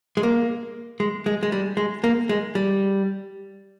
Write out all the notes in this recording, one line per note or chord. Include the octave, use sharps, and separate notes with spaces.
G#3
A#3
G#3
G#3
G#3
G3
G#3
A#3
G#3
G3